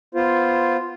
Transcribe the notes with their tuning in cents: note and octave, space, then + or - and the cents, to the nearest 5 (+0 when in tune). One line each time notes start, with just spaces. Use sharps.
B3 +0 F4 -5 C5 +0